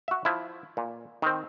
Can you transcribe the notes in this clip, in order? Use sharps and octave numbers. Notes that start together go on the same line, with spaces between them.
F#4 E5
F3 E4
A#2
D#3 C4